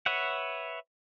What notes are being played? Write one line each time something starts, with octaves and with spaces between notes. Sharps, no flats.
B4 C#5 E5 F#5